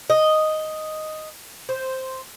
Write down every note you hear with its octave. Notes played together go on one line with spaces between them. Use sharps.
D#5
C5